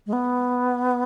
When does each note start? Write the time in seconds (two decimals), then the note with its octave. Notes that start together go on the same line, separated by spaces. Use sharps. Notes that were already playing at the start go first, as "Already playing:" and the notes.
0.06 G#3
0.13 B3